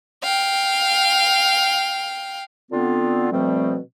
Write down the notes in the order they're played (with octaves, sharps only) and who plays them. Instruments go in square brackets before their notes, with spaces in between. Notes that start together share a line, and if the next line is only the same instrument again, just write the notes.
[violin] F5 G5
[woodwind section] D3 B3 C4 F4
B2 D3 F3 G3 A3 C4